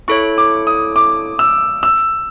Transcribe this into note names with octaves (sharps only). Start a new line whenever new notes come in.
E4 A4 C#5 C#6
D6
D#6
D6
E6
E6